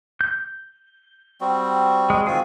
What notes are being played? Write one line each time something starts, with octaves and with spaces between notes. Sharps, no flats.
G6
G3 C4 F#4
G#3
D#3 C4 F4 F#4 G#4